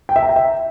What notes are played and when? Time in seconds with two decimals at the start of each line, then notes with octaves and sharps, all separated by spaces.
0.09 G5
0.16 E5
0.23 A#5
0.29 G5
0.36 E5